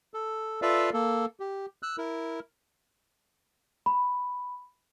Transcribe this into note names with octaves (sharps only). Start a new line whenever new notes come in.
A4
F4 A4 B4 D5 E5 F5
A#3 A4
G4
E6 F#6
E4 A#4
B5